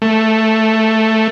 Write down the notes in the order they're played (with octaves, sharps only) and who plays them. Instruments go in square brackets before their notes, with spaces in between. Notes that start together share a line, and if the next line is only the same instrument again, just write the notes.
[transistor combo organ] A3